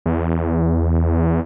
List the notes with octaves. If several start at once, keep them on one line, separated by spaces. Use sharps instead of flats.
E2